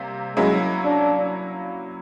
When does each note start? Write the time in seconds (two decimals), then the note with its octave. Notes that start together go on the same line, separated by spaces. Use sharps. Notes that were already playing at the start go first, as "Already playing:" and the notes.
Already playing: C3 G3 A#3
0.36 F#3 G#3 A#3 C#4 E4
0.85 D4